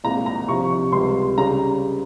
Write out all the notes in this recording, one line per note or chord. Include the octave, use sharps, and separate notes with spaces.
C2 A#2 G#3 C4 A#5
A#5
C2 C3 F3 C#6
C#6
C#2 C3 G3 C6
C#3 G3 A#5